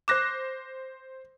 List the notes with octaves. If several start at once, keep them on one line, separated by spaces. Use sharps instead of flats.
C5 D6 F#6 A#6 E7